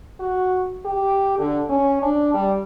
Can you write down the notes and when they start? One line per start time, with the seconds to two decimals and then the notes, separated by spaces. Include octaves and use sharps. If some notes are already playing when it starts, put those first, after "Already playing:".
0.20 F#4
0.85 G4
1.38 D3
1.69 C#4
2.02 D4
2.34 G3